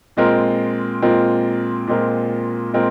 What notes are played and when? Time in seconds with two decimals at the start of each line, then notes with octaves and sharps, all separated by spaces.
0.17 A#2 G#3 C4 F4 A#4
1.02 A#2 G#3 C4 F4 A#4
1.87 A#2 G#3 C4 F4 A#4
2.73 A#2 G#3 C4 F4 A#4